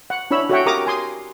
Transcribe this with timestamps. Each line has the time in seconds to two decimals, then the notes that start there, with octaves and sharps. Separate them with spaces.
0.10 F#5
0.31 D4 E4 C#5 B5 E6
0.50 F#4 A4 C#5 E5 F#5 G5
0.66 G4 A#4 A#5 D6 D#6
0.87 G#5 C6 D#6